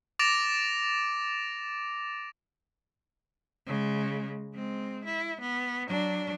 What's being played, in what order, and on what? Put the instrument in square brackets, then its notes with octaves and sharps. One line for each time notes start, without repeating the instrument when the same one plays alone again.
[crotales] D6 A6 A#6 D7 E7 F7
[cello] C#3 G#3
G#3 C4
E4
B3
F#3 D4